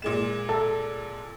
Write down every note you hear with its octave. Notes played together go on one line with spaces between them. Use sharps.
A#2 G#3 E7
A4